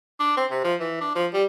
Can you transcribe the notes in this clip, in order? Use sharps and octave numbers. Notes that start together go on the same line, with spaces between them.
D4
C4
C3
F3
E3
D4
F3
G3